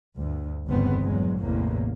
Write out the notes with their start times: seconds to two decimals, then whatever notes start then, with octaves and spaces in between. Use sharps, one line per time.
0.15 D2 G2
0.68 G1 E2 C#3 B3 C4
1.01 A#1 E2 G2 F#3 G#3
1.40 A1 E2 A2 C3 A#3